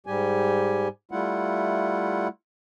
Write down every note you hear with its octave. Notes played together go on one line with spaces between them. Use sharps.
G#2 G3 G4 G#5
G3 A3 E4 F4 F#5